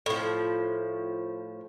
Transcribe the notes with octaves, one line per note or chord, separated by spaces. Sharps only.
A2 F3